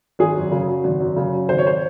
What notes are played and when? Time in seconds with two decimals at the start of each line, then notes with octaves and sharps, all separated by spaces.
0.19 G#1 G#4
0.35 F#2
0.51 C#3
0.67 F#3
0.84 G#1
1.00 F#2
1.17 C#3
1.32 F#3
1.48 G#1 C5
1.58 C#5
1.67 C5